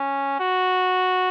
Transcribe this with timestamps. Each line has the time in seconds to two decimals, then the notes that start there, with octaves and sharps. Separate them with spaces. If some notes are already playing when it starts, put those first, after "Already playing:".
Already playing: C#4
0.40 F#4